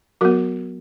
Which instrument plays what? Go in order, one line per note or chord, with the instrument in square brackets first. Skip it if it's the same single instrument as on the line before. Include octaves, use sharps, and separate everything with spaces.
[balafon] F#3 B3 F#4 A#4